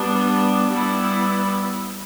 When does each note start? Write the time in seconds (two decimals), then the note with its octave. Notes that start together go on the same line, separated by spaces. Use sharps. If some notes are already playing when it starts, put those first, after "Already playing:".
Already playing: G3 B3 D4
0.68 G3 B3 E4